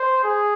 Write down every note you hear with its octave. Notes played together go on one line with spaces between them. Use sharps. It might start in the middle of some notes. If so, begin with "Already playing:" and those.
Already playing: C5
G#4